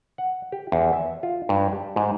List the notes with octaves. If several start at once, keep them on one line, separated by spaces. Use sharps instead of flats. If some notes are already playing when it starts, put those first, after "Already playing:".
F#5
G4
E2
E5
F4
G2
G4
G#2